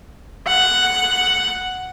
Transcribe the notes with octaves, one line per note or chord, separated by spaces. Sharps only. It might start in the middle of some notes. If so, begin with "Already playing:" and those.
F#5